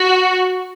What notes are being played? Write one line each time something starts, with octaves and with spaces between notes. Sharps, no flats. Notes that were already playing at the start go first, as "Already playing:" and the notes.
Already playing: F#4